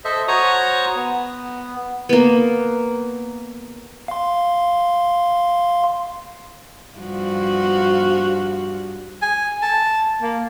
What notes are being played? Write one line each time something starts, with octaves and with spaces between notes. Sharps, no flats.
A4 C5 D#5 E5
F#4 C5 C#5 A#5 C#6 D#6
B3
A#3 B3
F5 C6
G2 F3 F#4
G#5
A5
A#3